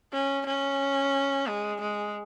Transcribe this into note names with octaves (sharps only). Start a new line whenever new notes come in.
C#4
C#4
G#3
G#3